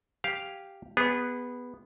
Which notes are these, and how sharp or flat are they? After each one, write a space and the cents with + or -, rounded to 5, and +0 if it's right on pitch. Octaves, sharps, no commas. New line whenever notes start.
G4 +0 F5 +0 G#5 -15
B3 +0 G#4 -30